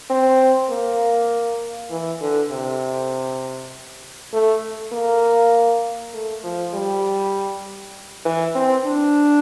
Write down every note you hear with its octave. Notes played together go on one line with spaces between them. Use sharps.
C4
A#3
E3
D3
C3
A3
A#3
A3
F3
G3
E3
C4
D4